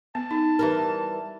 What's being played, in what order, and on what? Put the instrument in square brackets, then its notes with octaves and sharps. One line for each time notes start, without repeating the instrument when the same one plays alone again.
[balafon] B3 [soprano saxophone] A5
[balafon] D#4
[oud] E3 G3 A#4